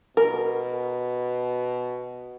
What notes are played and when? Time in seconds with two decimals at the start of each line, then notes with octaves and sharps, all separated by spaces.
0.17 B2 A#4